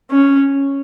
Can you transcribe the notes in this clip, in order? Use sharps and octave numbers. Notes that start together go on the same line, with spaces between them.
C#4